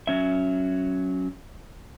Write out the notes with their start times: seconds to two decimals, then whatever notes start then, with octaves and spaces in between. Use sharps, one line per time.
0.07 F#3 C#4 E5